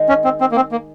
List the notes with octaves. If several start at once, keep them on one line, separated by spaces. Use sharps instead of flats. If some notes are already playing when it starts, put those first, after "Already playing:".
Already playing: D#3 G#3 D#4
C#4
C4
C4
A#3
C4
A#3